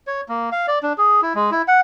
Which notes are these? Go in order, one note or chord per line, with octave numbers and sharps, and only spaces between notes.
C#5
A#3
F5
D5
D4
G#4
E4
G#3
E4
F#5